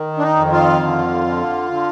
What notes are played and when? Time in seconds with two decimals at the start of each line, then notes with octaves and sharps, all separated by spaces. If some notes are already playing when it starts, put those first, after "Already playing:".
Already playing: D#3
0.18 D4
0.22 D#4
0.37 F2
0.52 F4
0.82 D3
1.26 D3
1.71 D3